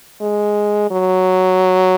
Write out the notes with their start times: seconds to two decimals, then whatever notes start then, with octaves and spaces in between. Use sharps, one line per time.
0.21 G#3
0.91 F#3